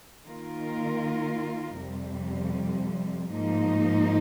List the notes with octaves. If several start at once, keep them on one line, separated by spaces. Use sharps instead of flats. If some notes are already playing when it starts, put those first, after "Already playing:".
D#3 A#3 F4 A#4
F2 C3 G3
G#2 F3 A#3 D#4